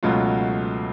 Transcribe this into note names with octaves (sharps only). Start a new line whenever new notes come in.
C#2 B2 F#3 A3 F4